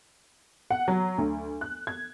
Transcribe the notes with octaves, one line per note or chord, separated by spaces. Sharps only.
F#5
F#3
D2
F#6
G#6